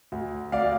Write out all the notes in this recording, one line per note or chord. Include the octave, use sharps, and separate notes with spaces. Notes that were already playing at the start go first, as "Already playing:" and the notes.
D2
D2 D5 F5